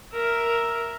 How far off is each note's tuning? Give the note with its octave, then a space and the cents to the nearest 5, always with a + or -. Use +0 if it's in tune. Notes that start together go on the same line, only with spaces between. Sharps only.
A#4 +0 E5 +0